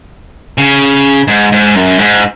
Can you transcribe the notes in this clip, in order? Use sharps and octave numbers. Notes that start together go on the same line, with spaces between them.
C#3
G#2
G#2
F#2
G#2